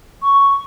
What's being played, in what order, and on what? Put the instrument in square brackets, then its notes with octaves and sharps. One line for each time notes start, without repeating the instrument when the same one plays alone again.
[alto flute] C#6